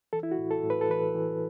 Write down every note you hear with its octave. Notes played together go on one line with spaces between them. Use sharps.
E3 A4
E4
F#4
A2
A4
A2
B4
A4
E3 B4
E3